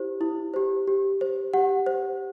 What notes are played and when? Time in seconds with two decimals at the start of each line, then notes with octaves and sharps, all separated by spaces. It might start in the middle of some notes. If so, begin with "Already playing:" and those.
Already playing: E4 G4 C5
0.21 E4
0.54 G4 C5
0.87 G4
1.21 C5
1.54 G4 F#5
1.86 C5